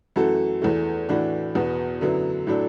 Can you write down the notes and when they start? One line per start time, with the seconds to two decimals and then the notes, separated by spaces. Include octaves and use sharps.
0.16 F#2 E3 A3 F#4 A4
0.62 E2 E3 A3
1.09 A2 E3 D4 F#4
1.55 E2 B2 B3
2.01 F#2 D3 F#3 B3 E4
2.47 A2 F#3 D4 A4